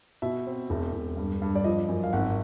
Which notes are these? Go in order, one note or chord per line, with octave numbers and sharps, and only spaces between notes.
B2 E5
C4
E1
E1
G2
G2
D5
F3 D#5
F#2
F5
G#1 F#5